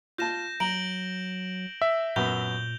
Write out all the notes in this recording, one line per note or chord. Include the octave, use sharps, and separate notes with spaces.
F4 A5 G6 A#6 E7
F#3 A#5 D7 F#7 G7
E5
F#2 A#2 B3 G6 F7 G7